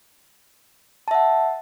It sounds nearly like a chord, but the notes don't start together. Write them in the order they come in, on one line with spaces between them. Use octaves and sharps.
A5 E5 F#5